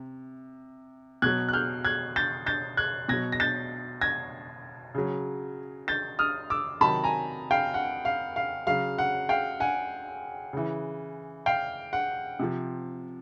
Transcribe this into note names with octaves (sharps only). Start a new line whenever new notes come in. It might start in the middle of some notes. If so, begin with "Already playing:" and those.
Already playing: C3
B2 F#3 F#6 G#6
F#6
F6 G6
F#6 G#6
G6 A6
G6 A6
F#6 G#6
B2 F#3 G#6 A#6
A#6
G6 A6
G#6 A#6
C#3 F#3
G6 A6
D#6 F6
D6 E6
C3 D#3 F#3 A5 B5
G#5 A#5
F5 G5
F#5
F5
F5
C#3 F#3 F5
F#5
F5 G5
F#5 G#5
C#3 E3
F5 G5
F#5
C3 F3